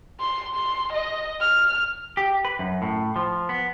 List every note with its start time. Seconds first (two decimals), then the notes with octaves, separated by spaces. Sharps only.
0.20 C6
0.55 C6
0.93 D#5
1.41 F6
2.17 G4
2.45 B4
2.59 F#2
2.82 A2
3.16 F3
3.49 B3